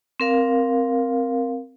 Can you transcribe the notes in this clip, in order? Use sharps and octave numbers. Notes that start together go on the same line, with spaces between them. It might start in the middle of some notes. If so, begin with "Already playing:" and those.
C4 A#4 F5